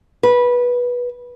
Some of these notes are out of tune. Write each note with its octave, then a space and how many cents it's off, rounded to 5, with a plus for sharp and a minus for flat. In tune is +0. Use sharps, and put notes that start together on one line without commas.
B4 -15